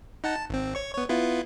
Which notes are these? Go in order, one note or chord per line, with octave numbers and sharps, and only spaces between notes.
D#4 F#5 A5
A5
G#1 C4
C#5 C#6
B3 C#5
B3 E4 F4